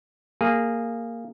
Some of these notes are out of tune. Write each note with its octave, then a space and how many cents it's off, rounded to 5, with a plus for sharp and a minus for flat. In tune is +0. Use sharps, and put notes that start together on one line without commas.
A#3 -10 G#4 -10